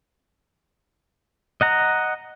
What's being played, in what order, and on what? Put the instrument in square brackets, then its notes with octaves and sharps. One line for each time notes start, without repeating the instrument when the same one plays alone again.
[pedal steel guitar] D#5 F#5 A#5